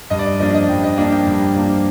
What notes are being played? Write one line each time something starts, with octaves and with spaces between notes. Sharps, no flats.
G2 D#5
D5
D#5
F3 A#3 D4 D#5
D#5
G2 G5
D#5
F3 A#3 D4 F5
G5
G2
F3 A#3 D4